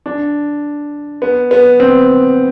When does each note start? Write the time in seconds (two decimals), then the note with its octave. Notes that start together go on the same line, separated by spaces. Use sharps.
0.06 D4
1.22 B3
1.51 B3
1.80 C4